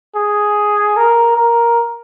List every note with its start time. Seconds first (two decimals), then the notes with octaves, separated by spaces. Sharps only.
0.16 G#4
0.97 A#4
1.37 A#4